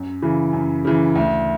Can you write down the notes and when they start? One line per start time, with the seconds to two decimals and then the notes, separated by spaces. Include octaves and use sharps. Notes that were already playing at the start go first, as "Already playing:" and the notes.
Already playing: F#2
0.22 C#3 E3
0.53 F#2
0.85 C#3 E3
1.16 D2